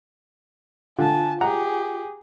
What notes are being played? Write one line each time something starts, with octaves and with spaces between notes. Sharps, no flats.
D3 F4 G#5 A5
G4 G#4 F#5 A#5